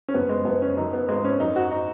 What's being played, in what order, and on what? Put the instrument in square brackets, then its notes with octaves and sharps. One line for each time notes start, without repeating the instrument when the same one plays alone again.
[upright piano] C#4
F#1 B3
G#3
F#1 B3
C#4
F#2 D#4
B3
G#1 G#3
C#4
F#2 D#4
F#4
D#4